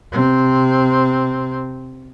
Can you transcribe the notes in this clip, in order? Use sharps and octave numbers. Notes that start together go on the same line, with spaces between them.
C3 C4